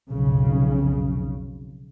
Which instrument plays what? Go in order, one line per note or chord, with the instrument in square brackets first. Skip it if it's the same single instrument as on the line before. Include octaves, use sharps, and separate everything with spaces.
[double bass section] F1 B1 C#3